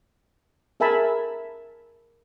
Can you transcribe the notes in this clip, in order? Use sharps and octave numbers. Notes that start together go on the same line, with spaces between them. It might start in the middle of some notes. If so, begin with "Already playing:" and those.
G#4 A#4 E5 G#5 A5 B5